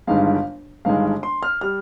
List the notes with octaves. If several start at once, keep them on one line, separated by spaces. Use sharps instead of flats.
G1 G2 D#3 G#3 F5
G1 G2 D#3 G#3 F5
C6
F6
G3 F6